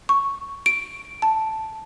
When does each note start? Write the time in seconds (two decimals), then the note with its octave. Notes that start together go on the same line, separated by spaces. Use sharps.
0.09 C#6
0.66 D7
1.22 A5